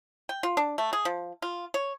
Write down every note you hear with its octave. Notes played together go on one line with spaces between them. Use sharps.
G5
F4
D4
A3
G#4
F3
F4
C#5